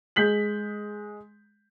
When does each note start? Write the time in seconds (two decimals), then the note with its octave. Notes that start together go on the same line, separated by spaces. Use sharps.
0.16 G#3 G6 B6 F#7